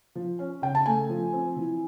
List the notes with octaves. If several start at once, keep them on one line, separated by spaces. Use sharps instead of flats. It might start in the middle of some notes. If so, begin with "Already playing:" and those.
F3
C#4
C#3 G5
A5
A3 G#5
F3
C4
E3